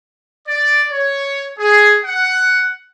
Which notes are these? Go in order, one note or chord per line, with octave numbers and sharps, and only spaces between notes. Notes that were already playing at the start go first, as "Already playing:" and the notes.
D5
C#5
G#4
F#5